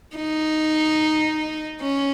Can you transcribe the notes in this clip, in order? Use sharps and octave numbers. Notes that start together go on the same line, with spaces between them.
D#4
C#4